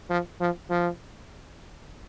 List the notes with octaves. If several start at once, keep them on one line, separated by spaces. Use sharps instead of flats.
F3
F3
F3